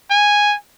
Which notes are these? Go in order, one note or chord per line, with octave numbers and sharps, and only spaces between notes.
G#5